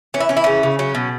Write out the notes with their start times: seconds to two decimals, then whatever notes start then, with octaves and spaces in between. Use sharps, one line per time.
0.14 E3 C#4
0.20 E4
0.29 E3 C#4
0.37 E4
0.44 C#3 C#4
0.63 C#3
0.79 F#3 C#4
0.95 B2